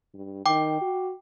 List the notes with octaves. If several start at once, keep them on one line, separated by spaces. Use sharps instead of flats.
G2
D#3 G5 D6
F#4